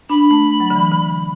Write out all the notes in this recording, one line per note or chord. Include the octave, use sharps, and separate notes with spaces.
D4 B5
A3
F#3
D3
E3
D3